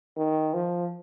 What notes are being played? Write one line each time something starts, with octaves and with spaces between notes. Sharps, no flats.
D#3
F3